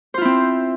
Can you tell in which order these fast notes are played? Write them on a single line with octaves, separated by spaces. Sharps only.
C5 F4 E4 C4